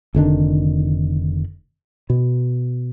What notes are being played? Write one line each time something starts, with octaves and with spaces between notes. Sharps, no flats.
F1 D3 D#3 D4
B2